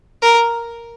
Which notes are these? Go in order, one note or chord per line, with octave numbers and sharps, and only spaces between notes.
A#4